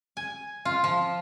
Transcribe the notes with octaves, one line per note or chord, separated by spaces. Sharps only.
G#5
F4
F3